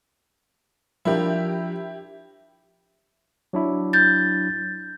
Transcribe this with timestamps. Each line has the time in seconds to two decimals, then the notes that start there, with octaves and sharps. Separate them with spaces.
1.05 F3 D4 E4 G4 A#4
3.53 F#3 D4 E4
3.93 G6 A6